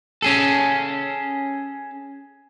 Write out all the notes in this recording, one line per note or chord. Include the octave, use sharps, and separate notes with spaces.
C#4 G#4 A4